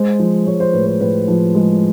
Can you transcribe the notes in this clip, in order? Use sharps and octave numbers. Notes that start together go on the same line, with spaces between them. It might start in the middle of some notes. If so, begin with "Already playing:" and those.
Already playing: G#3 C5
F3
G#3 C#5
C5
A2 B4
C5
A2 B4
F3
G#3